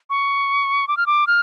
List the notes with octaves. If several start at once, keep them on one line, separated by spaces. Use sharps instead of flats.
C#6
D6
F6
D6
F6